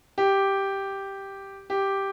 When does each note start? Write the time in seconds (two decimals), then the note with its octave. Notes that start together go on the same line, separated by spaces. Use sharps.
0.18 G4
1.70 G4